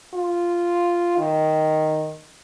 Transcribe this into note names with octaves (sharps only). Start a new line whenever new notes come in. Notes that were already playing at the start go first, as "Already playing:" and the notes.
F4
D#3